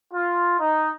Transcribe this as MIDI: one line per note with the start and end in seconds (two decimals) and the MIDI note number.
0.13 0.54 65
0.58 0.91 63